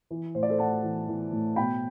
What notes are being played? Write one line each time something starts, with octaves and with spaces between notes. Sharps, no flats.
E3
A2 C5
D5
A4 C5
A2 F#5 A5
E3
E3
A2
B2 G5 B5